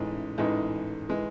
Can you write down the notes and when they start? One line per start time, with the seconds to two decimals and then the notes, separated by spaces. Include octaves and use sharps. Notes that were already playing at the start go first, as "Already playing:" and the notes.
Already playing: A1 G#2 E3 G#3 C#4
0.38 A1 G#2 E3 G#3
1.09 E3 G#3